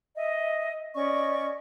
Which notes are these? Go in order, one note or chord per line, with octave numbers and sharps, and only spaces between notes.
D#5 E5
C#4 D5 D#5 C#6